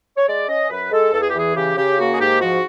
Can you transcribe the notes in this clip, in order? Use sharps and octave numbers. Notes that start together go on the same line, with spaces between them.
C#5
G#3 D5
C#4 D#5
F#2 B4
G#3 A4
E2 A4
G#4
G4
E3 G#4
C#3 G4
C#3 G4
A#3 F#4
G#4
G#2 G4
F3 F#4